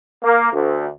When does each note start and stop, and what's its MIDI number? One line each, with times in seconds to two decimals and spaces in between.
0.24 0.53 58
0.53 0.87 38